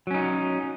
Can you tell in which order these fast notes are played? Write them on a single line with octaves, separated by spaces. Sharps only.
F#3 C#4 D#4